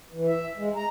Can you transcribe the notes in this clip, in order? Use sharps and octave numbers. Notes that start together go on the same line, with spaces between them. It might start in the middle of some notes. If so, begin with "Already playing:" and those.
E3
E5
G#3
A#5